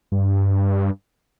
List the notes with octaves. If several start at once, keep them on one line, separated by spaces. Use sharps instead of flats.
G2